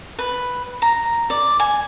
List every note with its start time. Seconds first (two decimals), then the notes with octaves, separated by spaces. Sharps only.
0.19 B4
0.82 A#5
1.30 D5
1.59 G#5